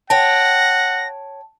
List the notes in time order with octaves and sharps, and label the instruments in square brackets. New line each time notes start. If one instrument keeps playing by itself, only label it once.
[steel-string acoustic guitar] C#5 G5 [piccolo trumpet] F#5 [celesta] A5 [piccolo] A#6